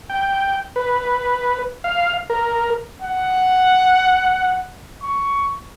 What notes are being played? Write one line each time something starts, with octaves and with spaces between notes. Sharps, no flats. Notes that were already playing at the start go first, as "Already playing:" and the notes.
G5
B4
F5
A#4
F#5
C#6